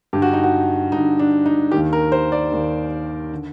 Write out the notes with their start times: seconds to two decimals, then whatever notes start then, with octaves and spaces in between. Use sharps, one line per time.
0.13 G2 D3 G4
0.22 F#4
0.33 D#4
0.44 F#4
0.92 G2 D3 D#4
1.19 D4
1.46 D#4
1.72 D#2 D#3 G4
1.93 A#4
2.12 C5
2.32 D5
2.52 D#2 D#3
3.32 D3